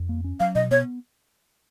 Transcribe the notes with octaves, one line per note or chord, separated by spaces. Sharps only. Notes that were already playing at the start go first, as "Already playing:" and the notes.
Already playing: F2
A#3
C#4
F#3 F5
B2 D#5
B3 C#5